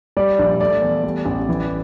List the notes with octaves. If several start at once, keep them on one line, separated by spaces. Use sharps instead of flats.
G3 D5
A#1
A3 D5
E2
G3
A1
E3